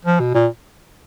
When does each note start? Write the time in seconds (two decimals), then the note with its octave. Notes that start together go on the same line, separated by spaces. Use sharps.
0.05 F3
0.20 B2
0.34 A#2